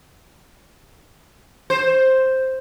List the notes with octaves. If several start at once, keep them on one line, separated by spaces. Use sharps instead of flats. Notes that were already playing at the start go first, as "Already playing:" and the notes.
C5